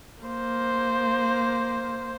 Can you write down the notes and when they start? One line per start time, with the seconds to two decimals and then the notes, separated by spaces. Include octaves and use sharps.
0.23 A#3 C5